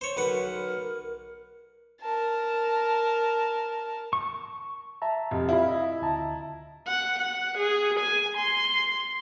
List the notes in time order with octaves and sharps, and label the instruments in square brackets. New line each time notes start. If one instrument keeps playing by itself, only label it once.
[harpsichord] C5 C#5
[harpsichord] B1 B4 F#5 [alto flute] A#4
[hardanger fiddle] A#4 A5
[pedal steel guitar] C#6
[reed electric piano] E5 A5 A#5
[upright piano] F1
[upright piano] E4 [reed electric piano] F4 F5 B5
[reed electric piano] D#5 E5
D2 A5 A#5
[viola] F#5
F#5
G#4
G#5
C6